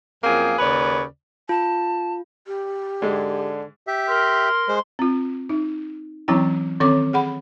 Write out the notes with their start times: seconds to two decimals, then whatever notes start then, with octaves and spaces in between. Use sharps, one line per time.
0.24 F#2 F3 A#3 C4 G#4
0.59 D#2 C#3 B4 C#5 D5
1.49 F4 A5
2.47 G4
3.02 G#2 D3 G#3
3.87 G4 E5
4.08 A#4 C6 F6
4.68 G#3 C5
4.99 C4 F4
5.49 D#4
6.28 E3 F#3 C4 C#4 E4 G5
6.80 D#3 C4 C#4 A4 C#5 D6
7.13 G#4 F#5 B5